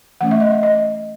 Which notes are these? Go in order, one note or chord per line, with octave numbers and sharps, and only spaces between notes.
E3 A3 C#4 F#5
E5
D#5
E5
D#5